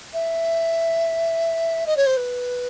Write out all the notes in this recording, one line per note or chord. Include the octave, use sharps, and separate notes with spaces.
E5
D#5
C#5
C5
B4